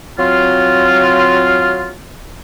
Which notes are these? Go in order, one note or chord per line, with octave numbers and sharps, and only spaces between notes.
F#3 C4 F4